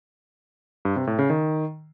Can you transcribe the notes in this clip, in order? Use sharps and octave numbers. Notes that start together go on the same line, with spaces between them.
G2
C3
A2
C#3
D#3